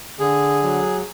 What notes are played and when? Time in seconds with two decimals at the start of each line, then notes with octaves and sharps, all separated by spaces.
0.19 D3 G#4
0.63 F#3